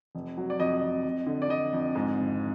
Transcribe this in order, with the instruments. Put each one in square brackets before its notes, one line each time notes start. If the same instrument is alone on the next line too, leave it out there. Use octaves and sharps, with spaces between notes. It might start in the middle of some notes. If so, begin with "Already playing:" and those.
[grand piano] F1
F#3
D5
F2 D#5
F2
F2
D3
D5
D3 D#5
F2
G#2
G#1